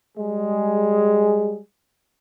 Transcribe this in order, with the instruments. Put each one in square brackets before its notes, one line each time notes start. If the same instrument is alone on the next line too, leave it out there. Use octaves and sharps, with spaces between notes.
[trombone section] G3 G#3 G#4